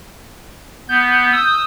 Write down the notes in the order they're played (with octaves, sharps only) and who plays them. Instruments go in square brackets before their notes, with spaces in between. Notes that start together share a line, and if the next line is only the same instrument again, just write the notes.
[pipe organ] B3 [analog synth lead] G6
[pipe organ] D#6 E6